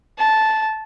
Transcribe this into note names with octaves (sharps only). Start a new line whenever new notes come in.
A5